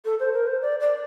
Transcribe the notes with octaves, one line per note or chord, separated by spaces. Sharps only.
A4
C5
A#4
C5
D5
D5